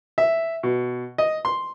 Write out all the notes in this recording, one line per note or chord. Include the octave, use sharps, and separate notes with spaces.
E5
B2
D#5
C6